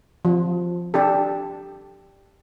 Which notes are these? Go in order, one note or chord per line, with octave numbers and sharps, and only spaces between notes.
F3
D4 G4 A4